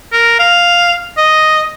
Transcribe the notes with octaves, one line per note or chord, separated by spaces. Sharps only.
A#4
F5
D#5